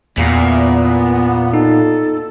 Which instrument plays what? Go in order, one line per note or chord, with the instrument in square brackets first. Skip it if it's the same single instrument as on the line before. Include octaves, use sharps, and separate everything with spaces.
[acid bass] E2 [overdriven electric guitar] A#2 [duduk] B3
[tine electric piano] D#4 [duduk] A4